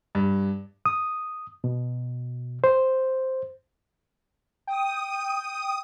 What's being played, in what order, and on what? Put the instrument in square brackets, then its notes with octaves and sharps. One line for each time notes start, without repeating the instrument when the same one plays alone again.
[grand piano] G2
[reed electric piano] D#6
B2
C5
[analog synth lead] G5 [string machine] D#6